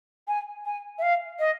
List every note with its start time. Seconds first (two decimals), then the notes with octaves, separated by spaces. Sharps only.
0.28 G#5
0.65 G#5
0.99 E5
1.02 F5
1.39 D#5